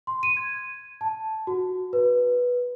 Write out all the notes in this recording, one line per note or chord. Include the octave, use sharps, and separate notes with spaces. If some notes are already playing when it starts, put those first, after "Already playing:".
C6
D#7
G#6
A5
F#4
B4